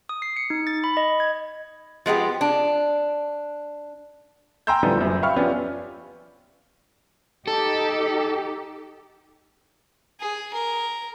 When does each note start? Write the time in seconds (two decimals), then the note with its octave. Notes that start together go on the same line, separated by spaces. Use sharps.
0.09 D#6
0.22 C7
0.37 C#7
0.50 D#4
0.67 A6
0.84 B5
0.97 D#5
1.20 G#6
2.06 F3 G#3 B3 G4
2.41 D4
4.67 G5 G#5 A#5 C6 E6 G6
4.83 A2 D3 F3 G3 B3 D#4
4.97 F#1 F#2
5.22 E5 F5 G5 B5 C#6 F6
5.36 F3 B3 C#4 D4 F4 G4
7.48 D#4 G4 A4
10.21 G#4
10.54 A#4